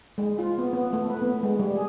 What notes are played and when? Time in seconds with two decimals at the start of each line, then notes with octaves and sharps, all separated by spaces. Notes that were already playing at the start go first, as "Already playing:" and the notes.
0.18 G#3
0.39 F4
0.58 B3
0.73 B3
0.93 A3
1.10 B4
1.22 B3
1.43 G#3
1.60 G3
1.76 G#4